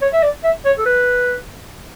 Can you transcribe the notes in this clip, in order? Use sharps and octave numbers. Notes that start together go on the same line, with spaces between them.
C#5
E5
D5
E5
C#5
A4
B4